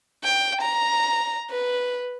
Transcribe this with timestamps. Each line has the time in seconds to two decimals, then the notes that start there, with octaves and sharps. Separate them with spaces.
0.24 G5
0.62 A#5
1.51 B4